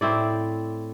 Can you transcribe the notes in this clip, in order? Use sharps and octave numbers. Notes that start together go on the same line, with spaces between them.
A2 C4 E4 D5